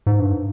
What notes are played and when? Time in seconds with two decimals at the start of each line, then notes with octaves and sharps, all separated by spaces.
0.07 G#2
0.20 G2